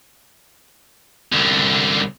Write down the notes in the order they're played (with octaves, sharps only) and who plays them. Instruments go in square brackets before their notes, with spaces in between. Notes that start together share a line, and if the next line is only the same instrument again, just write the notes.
[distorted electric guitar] C2 D3